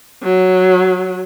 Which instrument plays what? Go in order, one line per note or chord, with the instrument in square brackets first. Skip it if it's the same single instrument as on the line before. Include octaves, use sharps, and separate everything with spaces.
[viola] F#3